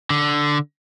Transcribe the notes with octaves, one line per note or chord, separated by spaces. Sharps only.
D3